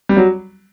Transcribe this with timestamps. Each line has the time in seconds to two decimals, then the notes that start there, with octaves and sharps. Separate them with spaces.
0.09 G3
0.17 F#3